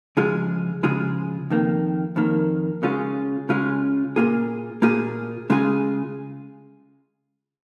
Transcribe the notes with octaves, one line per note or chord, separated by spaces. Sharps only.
C#3 F3 G#3 F4 G#4
C#3 F3 G#3 F4 G#4
F2 D#3 A#3
F2 D#3 A#3
C#3 G#3 C#4 F4 G#4
C#3 G#3 C#4 F4 G#4
A#2 A#3 F4 G#4
A#2 A#3 F4 G#4
C#3 G#3 F4 G#4